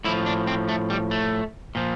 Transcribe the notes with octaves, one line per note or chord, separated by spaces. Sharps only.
A2 F3 E4
D4
C4
A3
G3
A3
A#2 F3